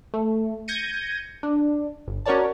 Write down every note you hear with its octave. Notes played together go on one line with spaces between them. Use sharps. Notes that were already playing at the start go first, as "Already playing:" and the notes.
A3
G6 G#6 A#6 C#7 D#7
D4
G1
C#4 F#4 A#4 C#5 D5 A5